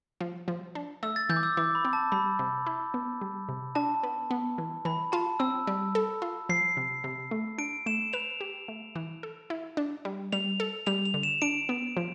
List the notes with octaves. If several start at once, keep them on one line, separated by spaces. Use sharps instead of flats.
F3
F3
D4
A3 E6
A6
E3 G6
D6
E6
E3 D6
B5
C4
A5
G3 B5
C3
E4
B3
G3
C3
D4 A5
B3
B3
E3
E3 B5
F4 A5
C4 E6
G3
A4
F4
F3 C7
C3
C3
A3
D4 D7
A3 E7
B4 F7
G4
A3
E3
A4
E4
D4
G3
G3 F7
A4
G3 F7
F7
D3
E7
D4 D7
B3
F3